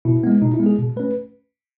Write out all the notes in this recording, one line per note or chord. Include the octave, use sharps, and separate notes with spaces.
B2 E4
G#3 B3
B2 D#4
E4
G#3 B3
G#4
B2
A3 C#4 B4